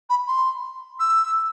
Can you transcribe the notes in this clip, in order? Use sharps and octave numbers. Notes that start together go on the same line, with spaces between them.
B5
C6
E6